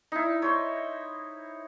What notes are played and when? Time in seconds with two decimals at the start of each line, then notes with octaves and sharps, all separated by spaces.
0.12 D#4 E4
0.42 C5 C#5